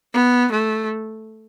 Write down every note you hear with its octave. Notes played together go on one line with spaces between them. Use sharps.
B3
A3